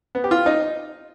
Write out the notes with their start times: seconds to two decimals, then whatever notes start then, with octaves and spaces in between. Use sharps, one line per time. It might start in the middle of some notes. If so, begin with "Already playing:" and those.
0.15 B3
0.24 G4
0.31 F4
0.46 D#4